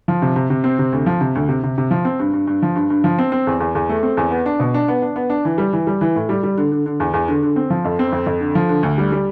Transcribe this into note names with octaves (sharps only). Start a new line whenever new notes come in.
F3
C3
C3
C3
C4
C3
D2
F3
C3
D2
C3
C3
C3
F3
C4
G2
G2
G2
F3
G2
G2
F3
C4
C4
E2
E2
E2
A3
C4
E2
B3
D4
B2
D4
B3
D4
B3
D4
E3
G3
E3
G3
E3
A2
G3
G3
D3
D3
D3
E2
E2
D3
D3
C4
F3
F2
C4
F2
F2
D3
F3
D3
D2
G3
G3